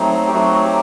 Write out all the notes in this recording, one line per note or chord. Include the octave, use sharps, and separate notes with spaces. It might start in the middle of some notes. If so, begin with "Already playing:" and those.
Already playing: F#3 A3 C4 D#4
G4
F#3 A3 C4 D#4 F#4
G4